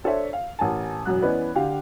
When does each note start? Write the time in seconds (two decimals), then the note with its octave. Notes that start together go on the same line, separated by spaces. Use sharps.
0.04 D4 A4 C5 C#5 E5
0.33 F5
0.59 A1 A#4 G#5 A5
1.05 E1 F#2 F#6
1.22 E3 B3 C#4 B4 D5 D#5
1.55 D3 G4 F5 G5